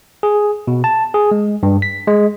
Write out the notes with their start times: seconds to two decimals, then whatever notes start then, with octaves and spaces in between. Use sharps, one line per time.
0.23 G#4
0.67 B2
0.84 A5
1.14 G#4
1.31 G#3
1.63 G2
1.82 B6
2.07 G#3